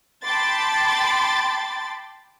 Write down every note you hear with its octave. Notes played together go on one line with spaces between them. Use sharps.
G5 A5 B5 C6 D6 A6